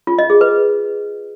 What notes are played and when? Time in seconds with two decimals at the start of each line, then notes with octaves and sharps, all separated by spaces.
0.07 F4
0.19 D#5
0.30 G#4
0.41 B4